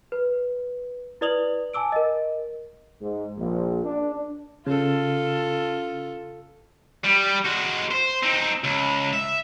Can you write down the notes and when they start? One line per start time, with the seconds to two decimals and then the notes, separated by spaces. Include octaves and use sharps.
0.12 B4
1.21 E4 B4 D5 D#6 F7 F#7
1.74 G#5 A5 D6 E6 D7
1.92 A#4 D#5
3.01 G#2
3.36 A#1
3.84 D4
4.66 C#3 F4 A4
7.04 G3
7.45 G#3 F#4
7.91 C5
8.23 C4 D#4
8.64 C#2
9.13 E5